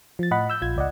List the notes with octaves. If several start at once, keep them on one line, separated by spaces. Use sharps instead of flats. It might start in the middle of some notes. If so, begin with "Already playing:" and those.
F3 A6
A2 D#5 F#5 B5
E6 G6
A#1 F4 G#6
C#2 D5 D#5 F#5